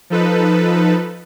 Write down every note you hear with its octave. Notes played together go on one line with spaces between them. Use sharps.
F3 D#4 A4 B4